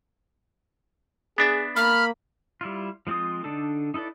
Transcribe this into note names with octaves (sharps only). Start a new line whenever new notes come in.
B3 D4 G#4 E5
A#3 B5 F6
G3 E4 F4
F3 G#3 C4 F4 D#6
D3 D4 D#4 A4
D#4 E4 A4 B4 D5